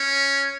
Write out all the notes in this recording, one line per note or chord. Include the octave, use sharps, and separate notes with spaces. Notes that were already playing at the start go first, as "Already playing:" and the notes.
Already playing: C#4